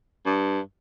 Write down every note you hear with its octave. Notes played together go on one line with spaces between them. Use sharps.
G2